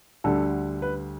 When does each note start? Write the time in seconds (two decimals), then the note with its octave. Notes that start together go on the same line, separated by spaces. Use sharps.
0.24 D2 D3 G3 A4
0.82 B4